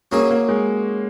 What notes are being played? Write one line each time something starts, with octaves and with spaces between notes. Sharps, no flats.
F#3 A#3 C#4 G#4
A#3
G#3